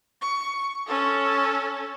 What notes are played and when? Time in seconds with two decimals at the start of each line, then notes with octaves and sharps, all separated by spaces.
0.22 C#6
0.87 C#4 A4